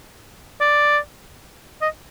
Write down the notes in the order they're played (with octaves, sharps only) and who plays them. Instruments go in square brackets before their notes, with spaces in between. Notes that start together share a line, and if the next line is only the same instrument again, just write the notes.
[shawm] D5
D#5